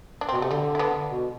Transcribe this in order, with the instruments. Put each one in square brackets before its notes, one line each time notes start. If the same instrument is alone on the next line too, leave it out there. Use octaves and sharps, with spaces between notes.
[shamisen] D4
C4
[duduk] B2 [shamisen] B3
[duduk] C3 [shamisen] A3
[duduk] D3 [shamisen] G3
[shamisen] E4
B3 D4
[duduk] B2